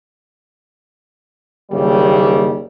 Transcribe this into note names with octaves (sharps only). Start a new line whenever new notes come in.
F#1 D#2 D#3 G3